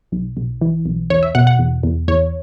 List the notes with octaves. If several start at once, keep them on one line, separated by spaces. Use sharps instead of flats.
B1
B1
E3
B1
E2 C#5
E5
B2 F#5
F#5
E2
E2
E2 C#5